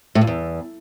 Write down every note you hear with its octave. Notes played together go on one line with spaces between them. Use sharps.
A2
G2
E2